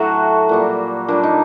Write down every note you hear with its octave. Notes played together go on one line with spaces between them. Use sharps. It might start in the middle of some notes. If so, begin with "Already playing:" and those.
Already playing: A2 F#3 A3 F#4
A#2 G3 A#3
A#2 G3 A#3 D4
D#4